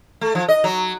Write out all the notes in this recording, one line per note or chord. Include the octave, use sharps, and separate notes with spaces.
A3
F3
D#5
F#3